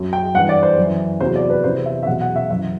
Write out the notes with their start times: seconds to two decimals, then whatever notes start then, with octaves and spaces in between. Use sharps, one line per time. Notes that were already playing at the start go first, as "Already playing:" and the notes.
Already playing: F#2 F#3
0.13 G5
0.34 G2 F#5
0.38 E3
0.49 D5
0.63 C5
0.77 F#2 E3
1.20 E2 C3 F#3 C5
1.36 D5
1.49 B4
1.63 E2 C3 E3 C5
1.86 E5
2.03 E5
2.06 E2 B2 F#3 F#5
2.21 F#5
2.36 E5
2.50 F#2 E3 E5